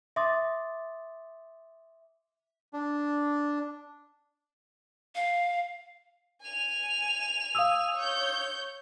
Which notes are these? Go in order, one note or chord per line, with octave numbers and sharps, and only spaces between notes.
E5 C6 D6 D#6 A6
D4
F5
G#5 F7
F5 D#6 E6
C#5 G6